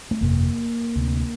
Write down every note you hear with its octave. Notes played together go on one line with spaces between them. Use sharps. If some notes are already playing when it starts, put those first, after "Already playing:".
A3
G1 F2 C3 A#3
D2 C3